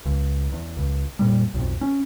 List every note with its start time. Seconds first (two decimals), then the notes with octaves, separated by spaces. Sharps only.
0.05 C#2
0.52 E2
0.77 C#2
1.19 F2 A#2 G3
1.54 B1 F2
1.81 C#4